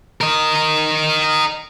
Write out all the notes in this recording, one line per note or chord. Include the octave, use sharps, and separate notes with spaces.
A#4 D#5